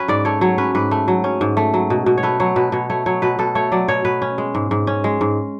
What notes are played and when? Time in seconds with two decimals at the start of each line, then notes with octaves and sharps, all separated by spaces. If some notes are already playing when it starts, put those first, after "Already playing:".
Already playing: F#3 C#4 B4
0.08 G#2 D5
0.25 A3 C#5
0.41 F#3 C#5
0.58 C#4 B4
0.75 G#2 B4
0.91 A3
1.08 F#3
1.24 C#4
1.41 G#2
1.57 A3
1.74 F#3
1.90 B2
2.06 B2
2.17 C#5
2.23 A3 B4
2.40 F#3 C#5
2.56 B2 B4
2.72 B2 C#5
2.90 A3 C#5
3.06 F#3 C#5
3.22 B2 B4
3.39 B2 A4
3.55 A3 C#5
3.72 F#3 D5
3.88 B2 C#5
4.05 B2 B4
4.22 C#4
4.38 G#3
4.55 G#2
4.71 G#2
4.87 C#4
5.04 G#3
5.21 G#2